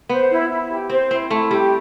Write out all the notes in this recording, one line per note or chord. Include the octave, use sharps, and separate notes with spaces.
B3 C5
E4
E4
G4
C4 C5
C4 E4
A3 E4
G3 G4